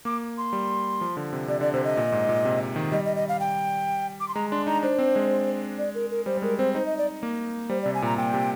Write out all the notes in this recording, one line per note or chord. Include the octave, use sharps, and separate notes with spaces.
A#3 D6
C6
G3
F3
D3
C3
C3 D5
D3 D5
C3 C5
D#5
A#2
G#2
A#2
C3
D#3
G3 D#5
D#5
D#5
F5
G5
D6
C6
G#3 A#5
D4 C6
D#4 A#5
D4 C5
C4
G#3
D5
A#4
A#4
G3 C5
G3
G#3 A#4
C4 C5
D#4 C5
D#5
D5
A#3
G3 C5
D5
C3
G#5
A#2 A#5
A#2 G5
C3